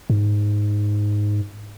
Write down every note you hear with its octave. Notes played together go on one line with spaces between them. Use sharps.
G#2